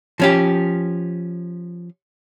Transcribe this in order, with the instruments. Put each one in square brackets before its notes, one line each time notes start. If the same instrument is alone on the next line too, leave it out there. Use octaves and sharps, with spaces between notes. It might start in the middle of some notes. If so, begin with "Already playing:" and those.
[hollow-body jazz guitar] F3 C#4 G4